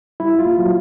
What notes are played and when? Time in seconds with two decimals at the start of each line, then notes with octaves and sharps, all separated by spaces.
0.20 G3 E4
0.39 F4
0.46 A#3
0.59 F#3 F#4